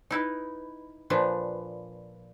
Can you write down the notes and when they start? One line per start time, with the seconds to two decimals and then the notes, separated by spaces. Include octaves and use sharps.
0.11 D#4 E4 B4
1.10 A#2 F3 D4 B4